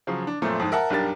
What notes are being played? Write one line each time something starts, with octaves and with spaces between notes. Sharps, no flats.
C#3 F3 F#3
D4
F#2 A#2 F3 A3 C4
F2 G#2
A#4 E5 F#5 A5
B1 G2 D4 G4 A#4 A6